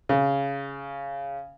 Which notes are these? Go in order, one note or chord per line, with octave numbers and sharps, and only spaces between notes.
C#3